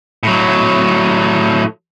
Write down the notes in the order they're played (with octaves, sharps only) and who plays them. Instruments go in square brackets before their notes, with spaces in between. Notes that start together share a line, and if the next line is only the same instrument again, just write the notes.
[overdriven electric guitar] A2 F#3